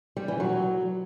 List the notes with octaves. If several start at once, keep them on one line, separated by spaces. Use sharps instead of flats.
G3
E3
F#3